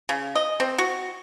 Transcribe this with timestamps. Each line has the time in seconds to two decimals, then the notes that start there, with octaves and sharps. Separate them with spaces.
0.09 C#3
0.35 D#5
0.60 C4
0.78 F#4